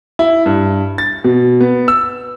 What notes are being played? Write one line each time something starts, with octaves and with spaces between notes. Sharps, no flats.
E4
G2
A6
B2
B3
E6